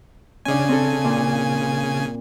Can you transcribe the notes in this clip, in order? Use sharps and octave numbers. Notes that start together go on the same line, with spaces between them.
C#3 C#4 D4 G#5
C4 A4
A#2